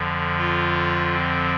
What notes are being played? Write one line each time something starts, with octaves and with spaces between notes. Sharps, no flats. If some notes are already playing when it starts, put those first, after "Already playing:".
Already playing: F2 D3 F3
F4
C4